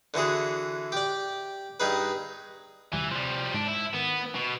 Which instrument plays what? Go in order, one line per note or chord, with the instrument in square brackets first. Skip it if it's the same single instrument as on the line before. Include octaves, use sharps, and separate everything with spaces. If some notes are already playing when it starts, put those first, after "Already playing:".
[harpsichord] D3 E3 F#4 G#4
G4 D5
G2 D#4 G#4 B4
[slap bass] D2 C3 G3 [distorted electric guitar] E3
[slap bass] C3 [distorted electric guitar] F3 G3
[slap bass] G#2 [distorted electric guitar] D4
[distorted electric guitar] E4
[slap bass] D#3 [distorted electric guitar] B3
[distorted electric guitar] B2